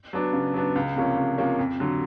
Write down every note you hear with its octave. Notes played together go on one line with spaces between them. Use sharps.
F#3 B3 D4
C#3
F#3 B3 D4
C#2
C3 F3 A#3 C#4
C#2
C3 F3 A#3 C#4
F2
D3 F#3